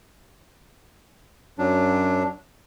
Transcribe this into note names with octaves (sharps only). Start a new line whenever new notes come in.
F#2 F#3 D4